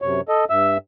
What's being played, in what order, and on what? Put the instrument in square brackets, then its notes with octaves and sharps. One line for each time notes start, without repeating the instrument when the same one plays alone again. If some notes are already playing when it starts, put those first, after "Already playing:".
[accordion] F#2 C3 C#5
A4 D#5
G2 E5 E6